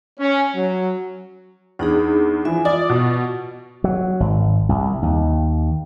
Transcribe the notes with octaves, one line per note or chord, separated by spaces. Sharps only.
C#4
F#3
E2 D4 D#4 G#4
E3 F3 E5 G#5
F4 D5 D#6
B2
F#3
G#1
C2
D#2